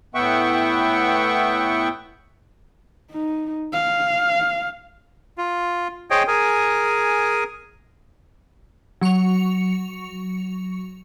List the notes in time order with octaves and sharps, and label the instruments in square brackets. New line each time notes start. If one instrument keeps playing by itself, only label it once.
[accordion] A2 B3 E5 F#5 G5 C#6
[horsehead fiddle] D#4
F5
[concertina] F4
G#4 C5 C#5 D#5 G5
G#4 A#4 G#5
[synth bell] F#3 C#6 C#7 F7